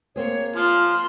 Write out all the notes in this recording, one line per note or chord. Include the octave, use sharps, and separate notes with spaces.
A#3 C4 G#4 C#5
F3 C6 F6